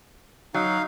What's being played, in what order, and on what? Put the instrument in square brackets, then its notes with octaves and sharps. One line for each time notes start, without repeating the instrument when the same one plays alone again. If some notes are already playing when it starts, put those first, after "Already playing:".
[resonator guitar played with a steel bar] F#3 [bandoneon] D#4 F5